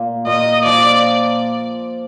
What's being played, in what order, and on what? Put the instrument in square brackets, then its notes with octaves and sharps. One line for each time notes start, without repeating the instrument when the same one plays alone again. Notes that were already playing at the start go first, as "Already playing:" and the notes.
Already playing: [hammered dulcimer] A#2
[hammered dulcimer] A#2 [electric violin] D#5
[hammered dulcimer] F3 [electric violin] D5